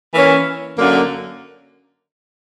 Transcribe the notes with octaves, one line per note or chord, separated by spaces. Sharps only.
E3 A#3 C#4
F#2 D3 A#3